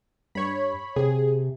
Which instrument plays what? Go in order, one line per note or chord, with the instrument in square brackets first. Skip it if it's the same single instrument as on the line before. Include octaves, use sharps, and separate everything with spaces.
[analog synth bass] G2 [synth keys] C#5 B5
[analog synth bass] C3 [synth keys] G#4